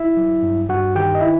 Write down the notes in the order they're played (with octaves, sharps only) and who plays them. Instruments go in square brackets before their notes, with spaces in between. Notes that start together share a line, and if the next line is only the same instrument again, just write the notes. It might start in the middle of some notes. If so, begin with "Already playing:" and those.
Already playing: [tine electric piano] E4 E5
F#3
G2
G2 F#4 F#5
D#3 G4 G5
D#5
E4 E5